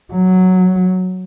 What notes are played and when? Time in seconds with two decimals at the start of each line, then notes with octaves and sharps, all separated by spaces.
0.14 F#3